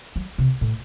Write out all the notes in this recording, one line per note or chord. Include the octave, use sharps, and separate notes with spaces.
F#3
C3
A2